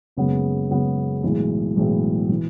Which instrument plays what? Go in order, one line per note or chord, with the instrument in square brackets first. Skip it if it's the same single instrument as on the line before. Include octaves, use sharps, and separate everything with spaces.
[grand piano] F#1 F#2 C#3 G#3 B3
F#1 F#2 C#3 G#3 B3
B1 A2 E3 G#3
B1 A2 E3 G#3
E3